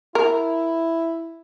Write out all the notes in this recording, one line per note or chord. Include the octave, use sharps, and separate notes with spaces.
E4 A#4